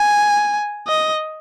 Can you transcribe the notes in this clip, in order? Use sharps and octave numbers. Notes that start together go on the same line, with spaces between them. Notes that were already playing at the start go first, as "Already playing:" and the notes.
Already playing: G#5
D#5